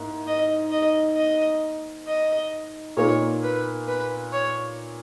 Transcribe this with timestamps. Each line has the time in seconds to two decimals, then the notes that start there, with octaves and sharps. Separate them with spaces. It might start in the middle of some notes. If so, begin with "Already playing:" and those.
Already playing: G#2 A#3 E4
0.27 D#5
0.71 D#5
1.17 D#5
2.08 D#5
2.97 A#2 A#3 D#4 C#5
3.43 B4
3.88 B4
4.33 C#5